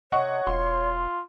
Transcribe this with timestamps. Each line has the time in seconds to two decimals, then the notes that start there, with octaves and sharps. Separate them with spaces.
0.12 C3 C#5 D#5 F#5 C#6
0.47 E1 F4 C6